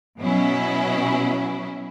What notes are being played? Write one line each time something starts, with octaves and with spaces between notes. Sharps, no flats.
B2 F#3 C#4 E4